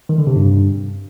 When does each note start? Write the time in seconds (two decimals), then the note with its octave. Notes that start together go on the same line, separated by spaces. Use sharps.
0.09 D#3
0.18 D3
0.27 C3
0.36 G2